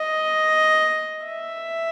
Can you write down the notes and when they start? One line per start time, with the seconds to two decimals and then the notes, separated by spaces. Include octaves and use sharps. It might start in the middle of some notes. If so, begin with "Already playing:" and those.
Already playing: D#5
1.26 E5